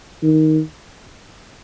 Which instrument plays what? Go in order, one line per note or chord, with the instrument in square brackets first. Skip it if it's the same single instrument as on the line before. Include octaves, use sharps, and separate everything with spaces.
[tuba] D#3